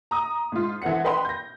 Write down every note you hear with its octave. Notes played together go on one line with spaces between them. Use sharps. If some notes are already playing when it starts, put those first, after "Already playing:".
A#5 D#6
G#2 F4
E3 A4 C5 F#5 C#7
B4 D#5 G5 B5 C6
G6 A#6